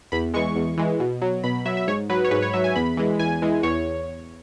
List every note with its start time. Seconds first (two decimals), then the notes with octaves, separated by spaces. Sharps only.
0.12 E2 B5
0.34 E3 G#3 C#6
0.56 E2
0.78 E3 G#3
1.00 B2
1.22 F#3
1.44 B2 B5
1.65 F#3 E5
1.77 E5
1.88 G#2 C#5
2.10 F#3 B4
2.24 C#5
2.31 G#2 B4
2.42 C#5
2.54 F#3 E5
2.64 G#5
2.76 E2 B5
2.97 E3 G#3
3.19 E2 G#5
3.42 E3 G#3
3.63 E2 C#5